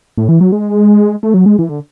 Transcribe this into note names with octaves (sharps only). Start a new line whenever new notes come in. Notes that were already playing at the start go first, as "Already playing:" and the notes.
A2
E3
F#3
G#3
A3
F#3
G#3
E3
D3